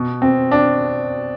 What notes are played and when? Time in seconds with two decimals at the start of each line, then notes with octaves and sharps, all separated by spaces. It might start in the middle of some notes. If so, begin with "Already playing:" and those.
Already playing: B2
0.22 C4
0.51 D4